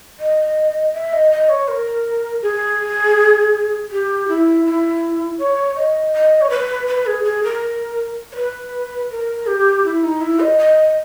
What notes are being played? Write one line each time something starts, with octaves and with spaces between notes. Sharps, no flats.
D#5
E5
D#5
D#5
C#5
A#4
G#4
G4
E4
E4
C#5
D#5
D#5
C#5
B4
B4
G#4
G#4
A#4
C#5
B4
A#4
G4
E4
D#4
E4
D#5
D#5